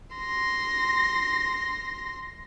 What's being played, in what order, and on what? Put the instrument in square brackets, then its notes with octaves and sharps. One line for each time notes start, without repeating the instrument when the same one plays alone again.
[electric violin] C6 A#6